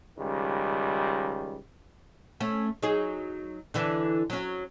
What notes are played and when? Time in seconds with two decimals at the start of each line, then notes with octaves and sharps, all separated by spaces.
0.19 C#2 D#3 G3
2.40 A3 C#4
2.83 F#3 D#4 G#4
3.74 D3 E3 D4
4.30 F#3 C#4